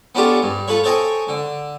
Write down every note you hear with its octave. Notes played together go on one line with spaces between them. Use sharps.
B3 C#4 D4 F4 G4 A4
G2
F4 A4 B4 C#5
A4 C5 C#5 D#5 G5 G#5
D3